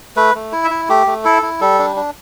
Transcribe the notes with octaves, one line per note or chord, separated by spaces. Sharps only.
A3 B4
A3
E4
E5
E4
A3 G4
A3
E4 A4
E4
G3 A4
D4
D4